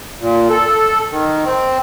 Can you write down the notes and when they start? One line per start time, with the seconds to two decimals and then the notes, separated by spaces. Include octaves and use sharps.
0.20 A#2
0.50 A4
1.11 D#3
1.45 C4